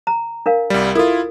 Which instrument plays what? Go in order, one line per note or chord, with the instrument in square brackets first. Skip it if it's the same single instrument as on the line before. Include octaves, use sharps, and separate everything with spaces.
[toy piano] A#5
D4 A#4 F5
[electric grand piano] C2 G3
[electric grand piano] E4 F4 [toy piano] A4 A#4